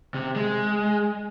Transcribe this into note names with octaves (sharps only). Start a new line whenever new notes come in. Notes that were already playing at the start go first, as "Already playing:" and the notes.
C3
G#3